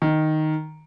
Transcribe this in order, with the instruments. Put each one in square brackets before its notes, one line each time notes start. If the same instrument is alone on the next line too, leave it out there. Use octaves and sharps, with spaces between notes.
[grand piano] D#3